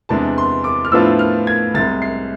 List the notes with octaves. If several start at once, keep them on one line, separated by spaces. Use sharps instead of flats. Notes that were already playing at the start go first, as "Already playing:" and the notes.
E2 C3 G#3 D4 A5
C6
D6
F6
A2 F3 B3 D4 F4 E6
F6
G#6
C2 C3 G#3 A6
C7